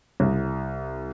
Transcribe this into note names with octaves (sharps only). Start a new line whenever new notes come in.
C2